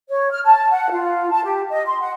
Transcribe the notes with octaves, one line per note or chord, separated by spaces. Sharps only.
C#5
F6
A5
F#5
F4
A5
G4
D#5
C6
F#5